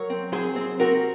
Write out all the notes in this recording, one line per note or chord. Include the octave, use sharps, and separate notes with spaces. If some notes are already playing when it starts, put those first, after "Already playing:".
Already playing: F#3 A#4 C#5
C4
F#3 G#4 C5
C4
C4 F#4 A#4